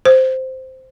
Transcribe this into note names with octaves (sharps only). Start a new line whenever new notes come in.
C5